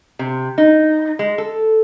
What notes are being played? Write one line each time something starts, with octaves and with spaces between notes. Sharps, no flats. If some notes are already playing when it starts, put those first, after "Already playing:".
C3
D#4
G#3
A4